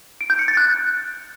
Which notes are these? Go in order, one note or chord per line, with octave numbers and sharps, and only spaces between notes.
D7
G6
C#7
A6
F#6